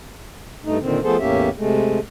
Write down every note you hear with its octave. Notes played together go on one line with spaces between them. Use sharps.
G2 A3 D#4
A#2 D3 D#3 C4
F3 A3 B3 G#4 A4 C5
E2 A2 A#3 C#4 G4 E5
C3 G#3 A3